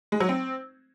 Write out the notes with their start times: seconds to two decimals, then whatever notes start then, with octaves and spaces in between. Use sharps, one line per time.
0.12 G#3
0.20 F#3
0.29 C4